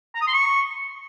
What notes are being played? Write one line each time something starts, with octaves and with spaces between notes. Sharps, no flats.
A#5
D#6
C6
C#6